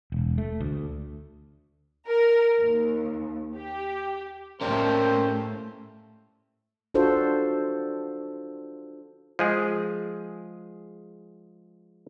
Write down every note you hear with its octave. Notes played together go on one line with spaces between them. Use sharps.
E1
A3
D2
A#4
D#2
G4
A2 A3 A#3 C#4 G4 C5 D5
D4 F4 F#4 A4 C5
F3 G#3 G#4